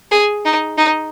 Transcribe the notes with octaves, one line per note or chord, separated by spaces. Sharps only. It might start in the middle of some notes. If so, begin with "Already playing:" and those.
G#4
D#4
D#4